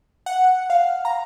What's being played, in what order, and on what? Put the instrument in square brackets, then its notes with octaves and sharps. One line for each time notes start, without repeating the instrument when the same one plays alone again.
[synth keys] F#5
F5
A#5